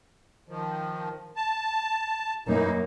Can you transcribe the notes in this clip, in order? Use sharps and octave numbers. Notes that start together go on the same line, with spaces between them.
D#3 F3
A5
F#2 E3 A#3 D#4